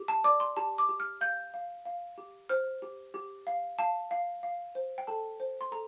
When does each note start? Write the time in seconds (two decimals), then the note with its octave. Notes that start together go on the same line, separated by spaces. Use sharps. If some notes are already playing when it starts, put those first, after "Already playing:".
Already playing: G4
0.08 A5
0.24 D5 D6
0.40 C6
0.56 G4 A5
0.78 D6
0.89 G4
1.00 F6
1.21 F5 G6
1.54 F5
1.85 F5
2.18 G4
2.49 C5 F6
2.82 G4
3.14 G4
3.47 F5
3.78 F5 A5
4.11 F5
4.43 F5
4.75 C5
4.98 G5
5.07 A4 A5
5.40 C5
5.61 C6
5.72 A4 A#5